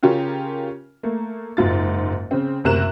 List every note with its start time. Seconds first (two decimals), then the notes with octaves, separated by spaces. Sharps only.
0.03 C#3 C#4 F4 G4 A#4
1.03 A3 A#3
1.57 F#1 G#2 F4 A6
2.31 C#3 C4
2.64 F#1 D2 C3 A#4 F#6 E7